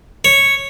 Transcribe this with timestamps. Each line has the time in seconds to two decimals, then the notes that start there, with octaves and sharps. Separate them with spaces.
0.25 C#5